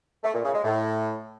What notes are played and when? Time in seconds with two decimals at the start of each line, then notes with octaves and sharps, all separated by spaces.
0.24 A3
0.34 A#2
0.44 C#3
0.54 G#3
0.64 A2